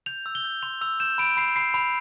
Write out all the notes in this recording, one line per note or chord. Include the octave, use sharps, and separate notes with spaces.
G6 F7
E6
G7
G6
C6 F7
E6 F7
G6 E7
B5 D7
B5 C7
B5 C7
B5